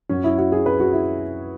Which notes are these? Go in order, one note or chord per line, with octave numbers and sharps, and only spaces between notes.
F#2 F#3 C#4
E4
F#4
G#4
B4
F#4
E4